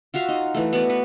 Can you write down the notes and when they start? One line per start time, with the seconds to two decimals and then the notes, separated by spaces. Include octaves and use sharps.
0.14 F4 F#4 E5 F5
0.28 D#4
0.55 E3 A3
0.73 B3 F#4 D5
0.90 B4 C#6